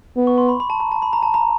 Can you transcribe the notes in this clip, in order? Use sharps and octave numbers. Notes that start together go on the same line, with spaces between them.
B3
C#6
C6
B5
B5
A5
A#5
A5
B5
A#5
A5
A#5